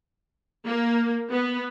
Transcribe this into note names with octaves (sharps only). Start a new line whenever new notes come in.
A#3
B3